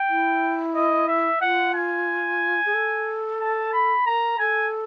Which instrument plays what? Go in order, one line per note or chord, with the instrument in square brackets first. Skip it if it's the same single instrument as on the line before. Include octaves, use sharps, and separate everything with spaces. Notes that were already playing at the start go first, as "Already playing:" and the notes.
Already playing: [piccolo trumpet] G5
[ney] E4
[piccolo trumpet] D#5
E5
[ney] F4 [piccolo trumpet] F#5
[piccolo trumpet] G#5
[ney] G#4
A4
[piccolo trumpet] A5
B5
[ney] A#4 [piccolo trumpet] A#5
[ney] A4 [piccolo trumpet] G#5